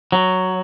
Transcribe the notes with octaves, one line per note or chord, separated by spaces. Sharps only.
F#3